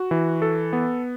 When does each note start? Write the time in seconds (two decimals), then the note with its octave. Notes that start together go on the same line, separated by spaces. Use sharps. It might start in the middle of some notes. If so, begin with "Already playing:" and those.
Already playing: F#4
0.11 E3
0.42 A4
0.73 B3